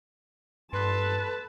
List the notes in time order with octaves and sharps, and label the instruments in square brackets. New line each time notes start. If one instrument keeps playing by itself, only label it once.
[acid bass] G2 [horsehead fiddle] A4 A5 [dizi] B4 [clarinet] C6